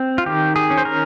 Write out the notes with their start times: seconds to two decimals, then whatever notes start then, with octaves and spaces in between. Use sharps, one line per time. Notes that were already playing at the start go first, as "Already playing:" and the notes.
Already playing: C4
0.18 F4
0.26 D#3 G4
0.56 G#4
0.70 C#4
0.78 C5
0.85 A#4